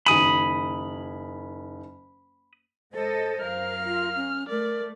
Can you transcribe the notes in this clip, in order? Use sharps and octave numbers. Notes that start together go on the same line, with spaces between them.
F#1 D#3 G#5 B5 D#6
G#2 A4 C5 D#5
F#2 A#4 F5 F6
F4
C#4
A3 A#4 D5